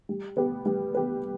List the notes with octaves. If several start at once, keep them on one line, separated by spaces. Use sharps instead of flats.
G3
B3 G4 B4
G3
B3 G4 B4